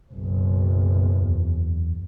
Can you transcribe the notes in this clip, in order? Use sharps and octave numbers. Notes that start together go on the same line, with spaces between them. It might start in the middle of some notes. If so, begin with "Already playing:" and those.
F#1 B1
E2